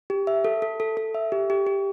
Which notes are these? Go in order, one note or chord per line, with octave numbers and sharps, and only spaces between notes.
G4
E5
A4
A4
A4
A4
E5
G4
G4
G4